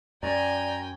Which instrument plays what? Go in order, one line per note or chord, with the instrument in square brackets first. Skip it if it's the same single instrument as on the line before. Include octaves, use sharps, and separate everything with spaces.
[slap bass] F#2 [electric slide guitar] D5 [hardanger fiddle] G5 G#5 [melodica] A#5